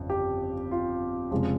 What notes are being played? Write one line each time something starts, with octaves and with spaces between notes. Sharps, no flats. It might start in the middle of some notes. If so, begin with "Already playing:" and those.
Already playing: G1 F2 C#3
G4
F4
F1 F2 C#3 F3 G#3